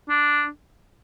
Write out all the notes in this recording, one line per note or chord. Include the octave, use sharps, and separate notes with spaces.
D4